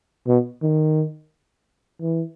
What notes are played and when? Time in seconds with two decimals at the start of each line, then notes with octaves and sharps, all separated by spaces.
0.28 B2
0.62 D#3
2.02 E3